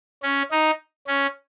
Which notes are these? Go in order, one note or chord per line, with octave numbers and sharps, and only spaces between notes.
C#4
D#4
C#4